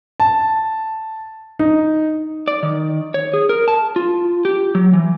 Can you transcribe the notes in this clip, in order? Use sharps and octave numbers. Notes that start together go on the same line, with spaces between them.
A5
D#4
D5
D#3
C#5
G#4
A#4
A5
F4
G4
F#3
E3